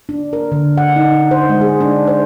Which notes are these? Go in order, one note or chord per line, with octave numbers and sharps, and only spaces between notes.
D4
A#4
D3
F#5
D#4
C5
G#3
G#4
D4
C5